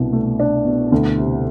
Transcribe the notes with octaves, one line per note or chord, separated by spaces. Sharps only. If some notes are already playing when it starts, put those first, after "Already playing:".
Already playing: C2 B2 D4
A3
D4
B2
D2
C3